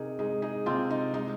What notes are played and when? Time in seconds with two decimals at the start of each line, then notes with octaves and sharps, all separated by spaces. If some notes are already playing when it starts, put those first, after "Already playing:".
Already playing: C3 D#4 G#4 A#4
0.19 G#3 D#4 G#4
0.42 D#4 G#4
0.66 C3 C4 F4
0.90 D#4
1.14 G#3 D#4